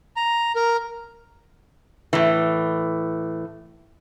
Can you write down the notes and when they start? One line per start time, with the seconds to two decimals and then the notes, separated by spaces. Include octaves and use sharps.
0.16 A#5
0.55 A#4
2.13 A2 E3